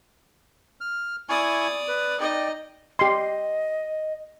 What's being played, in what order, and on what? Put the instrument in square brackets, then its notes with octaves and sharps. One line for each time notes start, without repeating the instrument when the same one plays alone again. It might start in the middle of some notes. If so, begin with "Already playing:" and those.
[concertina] F6
[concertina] E4 G#5 C#6 [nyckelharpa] D5 D#6
[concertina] B4
[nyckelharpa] D#4 D#5 [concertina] D5 G5
[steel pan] G4 C6 [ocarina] D#5